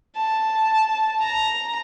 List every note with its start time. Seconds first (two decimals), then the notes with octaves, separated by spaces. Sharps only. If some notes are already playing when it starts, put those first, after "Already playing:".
0.16 A5
1.21 A#5